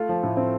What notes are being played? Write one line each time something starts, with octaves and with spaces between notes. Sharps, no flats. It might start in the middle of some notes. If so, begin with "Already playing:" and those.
Already playing: A3 F4
F3
A2
C4